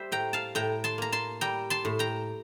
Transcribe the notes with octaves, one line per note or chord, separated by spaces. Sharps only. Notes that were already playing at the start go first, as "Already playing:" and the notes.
Already playing: G3 C5 E5
A2 G5 A#5
F5 A5
A2 G5 A#5
A5 C6
A#3 A#5
A5 C6
G3 G5 A#5
A5 C6
A2
G5 A#5